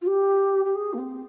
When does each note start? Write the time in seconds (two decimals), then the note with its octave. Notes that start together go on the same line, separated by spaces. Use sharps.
0.01 F4
0.07 G4
0.65 G4
0.75 G#4
0.93 A#3
0.98 C4